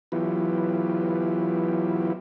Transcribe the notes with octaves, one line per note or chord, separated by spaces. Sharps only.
E3 F#3 B3 E4 F4 G4